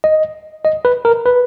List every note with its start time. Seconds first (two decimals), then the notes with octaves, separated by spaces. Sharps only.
0.04 D#5
0.65 D#5
0.85 B4
1.05 A#4
1.26 B4